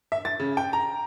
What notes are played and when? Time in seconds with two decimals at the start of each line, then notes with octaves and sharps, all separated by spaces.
0.12 E5
0.25 A6
0.40 C#3
0.57 G5
0.73 A#5